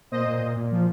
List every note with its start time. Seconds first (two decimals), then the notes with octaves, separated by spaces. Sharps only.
0.11 A#2 C5 D#5
0.27 A#2
0.41 A#2
0.56 A#2
0.72 F3